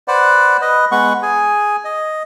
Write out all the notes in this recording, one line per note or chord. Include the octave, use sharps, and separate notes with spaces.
B4 C5 D5 F#5
B4 D#5
G#3 B3 F#5 C#6
G#4 G#5
D#5